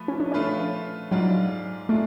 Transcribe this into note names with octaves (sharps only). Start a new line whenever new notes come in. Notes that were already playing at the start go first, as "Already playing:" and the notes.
Already playing: F3 A3 B4
C#4
D4
F3 A3 C#4 F4 B4
G#2 F#3 G#3 D4 F4
G#3 A3 D4 F4